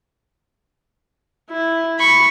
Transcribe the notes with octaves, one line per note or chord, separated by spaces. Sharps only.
E4
B5 C#6